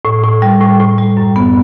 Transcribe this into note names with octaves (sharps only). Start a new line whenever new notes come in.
A2
A2
G3
A2
A2
G3
F#2
B3